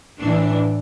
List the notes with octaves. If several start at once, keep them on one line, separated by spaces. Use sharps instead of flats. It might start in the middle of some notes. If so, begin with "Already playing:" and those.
A2 E3 D4